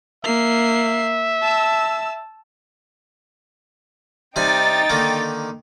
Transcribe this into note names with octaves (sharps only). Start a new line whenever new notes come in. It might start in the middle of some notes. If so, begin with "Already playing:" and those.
A#3 E5 C7
A5 E6
C3 G3 D#4 G5 G#5 A6
D3 D#3 A#3